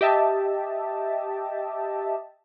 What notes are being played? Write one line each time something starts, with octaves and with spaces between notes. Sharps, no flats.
G4 D#5 E5 A5